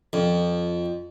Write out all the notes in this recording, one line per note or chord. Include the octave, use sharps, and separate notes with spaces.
F2